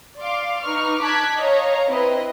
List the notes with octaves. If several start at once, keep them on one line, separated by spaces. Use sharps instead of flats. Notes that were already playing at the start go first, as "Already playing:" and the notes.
D5 F5 C6 D6
D#4 B4 C#6 F6
A5 D6 F#6 G#6 B6
C#5 D#5 F5 A#5
C4 E4 B4 D#5